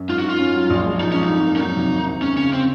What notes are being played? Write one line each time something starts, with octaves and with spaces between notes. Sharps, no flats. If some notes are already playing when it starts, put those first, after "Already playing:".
Already playing: F#2
G#2 F4
F#4
G#2
F4
C#4
F#3
A#1
G#3
F3 D#4
G#2 C#4
D#4
F2
A#3
C#4
F#3 D#4
C3
D#2
C4
G#3 C#4
C#3 C#4
C4